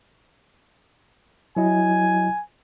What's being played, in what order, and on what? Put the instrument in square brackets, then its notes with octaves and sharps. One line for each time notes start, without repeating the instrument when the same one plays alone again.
[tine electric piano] F#3 E4 D#5 [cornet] G#5